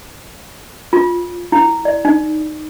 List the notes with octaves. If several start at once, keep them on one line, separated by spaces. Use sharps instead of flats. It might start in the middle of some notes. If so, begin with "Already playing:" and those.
F4
E4
D5
D#4